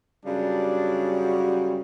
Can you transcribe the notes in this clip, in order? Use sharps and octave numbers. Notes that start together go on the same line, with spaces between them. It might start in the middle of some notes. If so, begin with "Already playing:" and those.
F#2 C#3 G3 D4
F#4